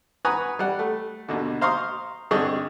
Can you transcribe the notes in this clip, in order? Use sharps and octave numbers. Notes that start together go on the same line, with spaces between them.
B4 F#5 G#5 A#5 C#6 D#6
G3 F#5
A3
D#2 B2 D3
C5 F5 A#5 C6 C#6 D#6
G2 D3 C4 G#4 D#5 C#6